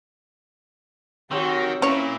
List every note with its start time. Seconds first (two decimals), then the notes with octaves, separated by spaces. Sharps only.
1.31 D#3 F#3 C4 F#4 G4
1.82 A#2 C#4 E4 C#5 E5